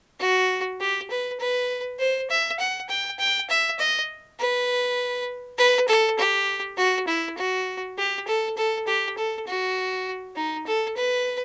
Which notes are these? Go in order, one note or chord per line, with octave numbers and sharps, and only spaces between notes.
F#4
G4
B4
B4
C5
E5
F#5
G5
G5
E5
D#5
B4
B4
A4
G4
F#4
E4
F#4
G4
A4
A4
G4
A4
F#4
D#4
A4
B4